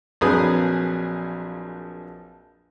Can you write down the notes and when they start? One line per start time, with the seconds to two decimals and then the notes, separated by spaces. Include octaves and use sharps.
0.21 A#1 F2 F#3 G#4 B4 D#6